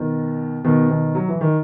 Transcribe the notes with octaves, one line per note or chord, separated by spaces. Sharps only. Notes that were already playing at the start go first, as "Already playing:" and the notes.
Already playing: B2 D#3
B2 D#3
B2 D#3
F#3
E3
D#3